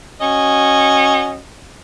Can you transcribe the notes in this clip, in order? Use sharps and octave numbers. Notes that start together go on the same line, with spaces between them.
C#4 F#4 D#5